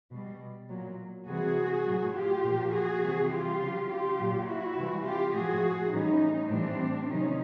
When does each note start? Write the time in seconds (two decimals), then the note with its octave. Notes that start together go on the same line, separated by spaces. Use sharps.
0.11 B2 G3
0.69 A#2 F#3
1.27 C3 E3 G3 F#4 G#4
1.85 A2 F#3
2.14 F4 G4
2.43 A#2 F3
2.72 F#4 G#4
3.02 C3 E3 G3
3.31 F4 G4
3.59 C#3 F#3
3.88 F4 G4
4.17 A#2 F#3
4.47 E4 F#4
4.75 C3 E3 G3
5.04 F4 G4
5.33 A2 F3 F#4 G#4
5.92 A2 E3 G3 C#4 D#4
6.50 A2 E3 G3 C4 D4
7.08 C3 D#3 F#3 C#4 D#4